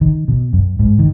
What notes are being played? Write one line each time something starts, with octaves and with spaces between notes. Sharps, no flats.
D#3
B2
F#2
G#2
D#3